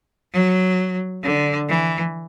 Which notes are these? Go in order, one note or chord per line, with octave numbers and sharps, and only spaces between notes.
F#3
D3
E3